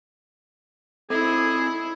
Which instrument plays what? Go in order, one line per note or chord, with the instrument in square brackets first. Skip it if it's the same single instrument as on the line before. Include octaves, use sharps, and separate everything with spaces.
[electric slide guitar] C4 D#4 [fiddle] E4 [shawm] G#4 [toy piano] A4